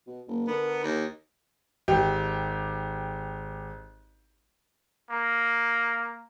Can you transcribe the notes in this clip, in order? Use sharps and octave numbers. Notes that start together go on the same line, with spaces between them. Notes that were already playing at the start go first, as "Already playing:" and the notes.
B2
F#1 A#3
D3 B3 A#4
D#2
G#1 G4
A#3